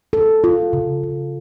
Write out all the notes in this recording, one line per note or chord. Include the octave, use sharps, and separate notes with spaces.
A4
F4
C#3
C#3